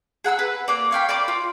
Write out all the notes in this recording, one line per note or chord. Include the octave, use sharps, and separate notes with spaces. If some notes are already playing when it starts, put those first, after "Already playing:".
G#4 F#5 B5 E6
B4
A#3 D5
C#5 F5 G5 B5
A#4 D5 B5 D6
F4